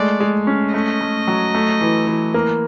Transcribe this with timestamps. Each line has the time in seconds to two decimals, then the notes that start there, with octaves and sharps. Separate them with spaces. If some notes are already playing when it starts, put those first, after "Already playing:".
Already playing: G#3 A3 D5
0.20 G#3
0.47 C#4
0.74 A3 D#5
1.01 A3
1.27 F#3
1.55 A3
1.81 E3
2.07 E3
2.34 A#3